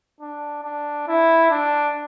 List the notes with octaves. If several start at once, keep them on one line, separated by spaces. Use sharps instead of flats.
D4
D4
E4
D4